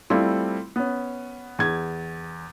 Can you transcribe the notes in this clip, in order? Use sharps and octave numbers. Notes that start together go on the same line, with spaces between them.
G3 A3 C4 E4 F4
B3 C#4
E2 G#6